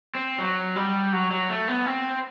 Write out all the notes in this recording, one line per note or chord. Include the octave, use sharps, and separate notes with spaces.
C4
F#3
G3
F#3
F#3
A3
B3
C4